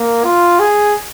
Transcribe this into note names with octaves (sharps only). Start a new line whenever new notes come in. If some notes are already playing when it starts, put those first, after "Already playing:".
Already playing: A#3
F4
G#4